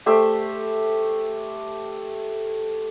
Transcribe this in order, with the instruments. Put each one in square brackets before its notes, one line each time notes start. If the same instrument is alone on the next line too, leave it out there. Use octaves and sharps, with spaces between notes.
[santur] A3 G4 C5 E5